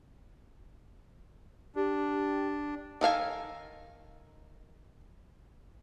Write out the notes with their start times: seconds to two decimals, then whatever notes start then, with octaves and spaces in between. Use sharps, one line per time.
1.76 D4 G4
3.01 D#3 A4 F5 G#5